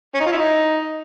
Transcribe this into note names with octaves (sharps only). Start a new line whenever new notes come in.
C#4
D#4
F4
E4
D#4